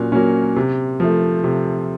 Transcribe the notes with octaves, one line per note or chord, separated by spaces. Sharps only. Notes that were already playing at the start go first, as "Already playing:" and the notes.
Already playing: A#2 F#3 C#4
F#3 A#3 C#4
C3
F3 A3
C3